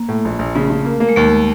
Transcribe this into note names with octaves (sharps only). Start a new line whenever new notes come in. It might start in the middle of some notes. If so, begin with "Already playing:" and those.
Already playing: A#3
A2
A#1
A#1
C#3 A3
C#3
A#3
A#3
G#3
D#2 A3